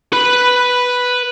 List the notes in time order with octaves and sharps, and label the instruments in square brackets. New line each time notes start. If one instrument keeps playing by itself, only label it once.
[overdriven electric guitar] B4 B5